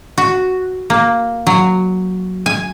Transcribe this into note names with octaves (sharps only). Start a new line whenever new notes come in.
F#4
A#3
F#3
G#5